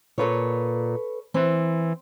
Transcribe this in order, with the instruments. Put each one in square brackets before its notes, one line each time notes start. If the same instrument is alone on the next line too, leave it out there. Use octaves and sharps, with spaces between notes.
[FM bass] A#2 [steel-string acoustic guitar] A4 B4 C#5
[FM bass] E3 [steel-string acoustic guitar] C4